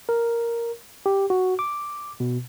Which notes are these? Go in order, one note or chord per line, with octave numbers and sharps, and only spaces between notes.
A#4
G4
F#4
D6
B2